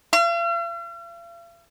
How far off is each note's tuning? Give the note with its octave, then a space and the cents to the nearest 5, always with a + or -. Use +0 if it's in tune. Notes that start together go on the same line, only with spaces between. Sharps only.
F5 -45